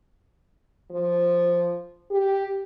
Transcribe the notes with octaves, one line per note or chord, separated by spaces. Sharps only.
F3
G4